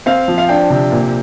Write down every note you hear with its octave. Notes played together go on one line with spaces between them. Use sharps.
C4 F5
F3
F5
D4 G5
C3
A#2